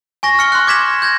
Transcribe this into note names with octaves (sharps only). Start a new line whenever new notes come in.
G#5 C#6 A#6
F6 C#7 G7
C6 F#6
D6 G#6 B6 E7 F#7
G6 G#6 A#6